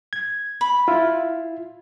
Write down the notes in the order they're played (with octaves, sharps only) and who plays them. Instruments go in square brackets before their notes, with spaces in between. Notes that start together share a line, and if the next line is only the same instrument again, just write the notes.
[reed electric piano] G#6
[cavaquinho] B5
[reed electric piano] E4 F4